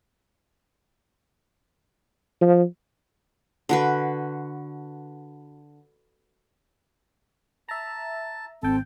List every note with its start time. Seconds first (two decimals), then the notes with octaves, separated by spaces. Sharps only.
2.42 F3
3.69 D3 F#4 B4
7.69 E5 A5 A#5
8.63 G#1 C4 A4 G5